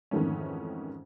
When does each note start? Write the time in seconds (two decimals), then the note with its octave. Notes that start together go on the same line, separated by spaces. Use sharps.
0.11 F2 G#2 D#3 E3 A3 C#4